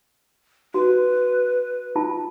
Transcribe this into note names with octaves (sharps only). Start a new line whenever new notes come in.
F#4 B4
F4 A5